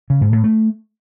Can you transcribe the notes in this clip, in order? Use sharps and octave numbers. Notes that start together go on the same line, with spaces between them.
C#3
G#2
A2
A3